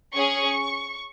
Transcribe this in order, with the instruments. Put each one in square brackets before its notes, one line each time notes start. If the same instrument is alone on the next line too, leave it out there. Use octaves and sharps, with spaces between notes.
[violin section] C#4 G#4 C#6